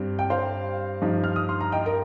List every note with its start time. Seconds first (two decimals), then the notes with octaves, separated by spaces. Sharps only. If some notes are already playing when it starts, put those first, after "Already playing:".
Already playing: G2 G3 C4
0.19 G5
0.30 C5 F5
1.01 G2 F3 D#4
1.24 F6
1.36 D#6
1.49 C6
1.61 A#5
1.72 D#5 G5
1.86 A#4